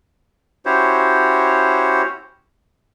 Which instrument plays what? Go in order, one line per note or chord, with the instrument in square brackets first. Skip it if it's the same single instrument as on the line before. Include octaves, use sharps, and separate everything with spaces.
[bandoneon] C#4 E4 F#4 G4 C5 C#5